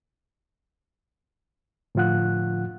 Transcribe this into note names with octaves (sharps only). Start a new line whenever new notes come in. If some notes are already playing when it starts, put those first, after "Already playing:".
A2 D3 F3 F4 F#5 F#6